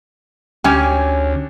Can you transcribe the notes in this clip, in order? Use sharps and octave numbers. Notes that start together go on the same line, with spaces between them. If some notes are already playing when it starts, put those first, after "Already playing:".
D2 C#4 G4 C#5 G#5